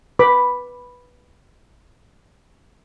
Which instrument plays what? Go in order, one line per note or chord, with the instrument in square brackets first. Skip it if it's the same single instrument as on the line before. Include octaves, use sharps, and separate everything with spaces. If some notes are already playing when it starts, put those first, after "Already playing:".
[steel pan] B4 B5 D6